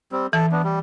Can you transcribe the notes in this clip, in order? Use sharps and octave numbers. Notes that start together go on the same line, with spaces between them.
G3 C4
E3 A4
B3 D4
G3